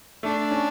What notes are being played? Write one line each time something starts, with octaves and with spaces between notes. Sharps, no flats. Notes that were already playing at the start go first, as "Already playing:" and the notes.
A3 D4
C#4